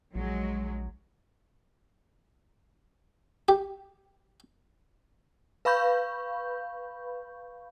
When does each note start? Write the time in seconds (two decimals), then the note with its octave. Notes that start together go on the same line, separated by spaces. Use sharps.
0.15 A#1 F#3 G#3
3.49 G4
5.65 B4 F5 B5 C#6 G6